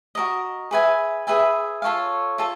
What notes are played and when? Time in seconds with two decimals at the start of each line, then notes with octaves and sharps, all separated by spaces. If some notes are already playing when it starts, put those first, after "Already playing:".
0.15 F#4 A#4 D#5
0.71 G#4 B4 E5 G#5
1.27 G#4 B4 E5 G#5
1.82 F4 A4 C#5 F5
2.38 F4 A4 C#5